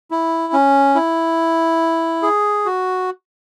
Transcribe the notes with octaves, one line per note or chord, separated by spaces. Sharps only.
E4
C#4
E4
G#4
F#4